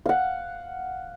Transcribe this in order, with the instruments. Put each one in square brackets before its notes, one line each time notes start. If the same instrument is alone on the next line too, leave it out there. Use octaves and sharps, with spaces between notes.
[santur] F5 F#5